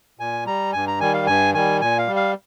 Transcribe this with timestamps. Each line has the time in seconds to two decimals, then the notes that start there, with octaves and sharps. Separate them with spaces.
0.19 A#2 G#5
0.46 G3 A#5
0.73 G2 G#5
0.87 A#5
1.00 D#3 G3 G#5
1.13 F5
1.26 G2 G#5
1.54 D#3 G3 G#5
1.81 A#2 G#5
1.98 F5
2.07 G3
2.16 F5